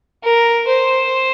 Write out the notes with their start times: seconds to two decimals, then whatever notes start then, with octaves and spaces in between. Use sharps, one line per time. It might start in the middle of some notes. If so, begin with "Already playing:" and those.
0.24 A#4
0.68 C5